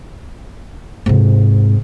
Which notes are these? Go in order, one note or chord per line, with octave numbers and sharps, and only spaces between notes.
G#2 C3